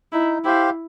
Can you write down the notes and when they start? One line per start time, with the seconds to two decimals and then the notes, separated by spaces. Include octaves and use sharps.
0.13 D#4 E4
0.44 E4 G4 C5 F5